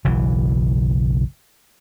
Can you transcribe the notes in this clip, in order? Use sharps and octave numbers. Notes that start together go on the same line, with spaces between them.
F#1 B1 E3